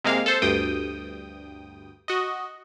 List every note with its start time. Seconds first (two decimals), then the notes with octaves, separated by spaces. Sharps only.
0.04 C3 G#3 A#3 F5
0.26 A4 C5
0.42 D2 G2 G5 D#6
2.08 F#4 D#5